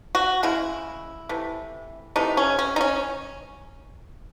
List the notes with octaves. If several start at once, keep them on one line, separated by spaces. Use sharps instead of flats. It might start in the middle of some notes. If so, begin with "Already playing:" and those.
F#4
C#3 G#3 E4
C3 E3 A3
C3 E3 A3 D#4
C#4
C#4
D#4
C#4